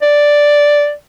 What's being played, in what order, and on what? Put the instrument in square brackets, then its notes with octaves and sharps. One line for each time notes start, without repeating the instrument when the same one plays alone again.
[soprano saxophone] D5